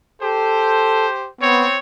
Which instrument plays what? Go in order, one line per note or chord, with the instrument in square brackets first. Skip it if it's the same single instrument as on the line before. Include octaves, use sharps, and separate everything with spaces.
[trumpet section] G4 C5 [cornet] A4
[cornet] B3 [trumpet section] C4 C#5